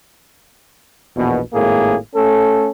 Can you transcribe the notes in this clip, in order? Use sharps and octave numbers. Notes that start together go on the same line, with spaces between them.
A#1 E2 B2
G#1 A2 A#3 G#4
A3 C#4 A4